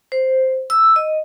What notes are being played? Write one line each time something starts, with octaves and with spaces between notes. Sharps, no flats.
C5
E6
D#5